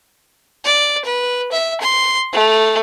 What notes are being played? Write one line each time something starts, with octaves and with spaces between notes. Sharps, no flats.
D5
B4
E5
C6
A3